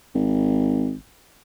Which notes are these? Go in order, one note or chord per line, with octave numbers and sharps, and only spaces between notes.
G#1